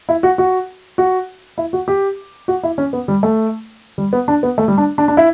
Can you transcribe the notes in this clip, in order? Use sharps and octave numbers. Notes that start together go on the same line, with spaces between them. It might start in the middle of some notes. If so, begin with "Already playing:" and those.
E4
F#4
F#4
F#4
E4
F#4
G4
F#4
E4
C#4
B3
G3
A3
G3
B3
D4
B3
A3
G3
D4
D4
D4
E4